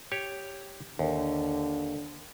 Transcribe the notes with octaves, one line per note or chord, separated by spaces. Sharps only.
G4 C#5
D#2 D3